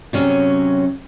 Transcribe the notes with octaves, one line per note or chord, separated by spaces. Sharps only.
C3 F#3 C#4